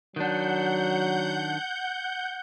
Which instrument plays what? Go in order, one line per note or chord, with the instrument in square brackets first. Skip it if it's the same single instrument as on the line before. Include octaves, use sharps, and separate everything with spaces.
[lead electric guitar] D#3 D4 [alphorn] F#3 [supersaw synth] F#5 G6